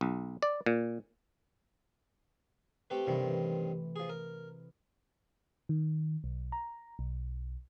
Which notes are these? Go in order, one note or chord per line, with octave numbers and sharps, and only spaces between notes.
B1
D5
A#2
A3 C4 G4 B4
G2 C3 D#3 E3 C4
F3 G#4
A#4
D#3
B1
A#5
B1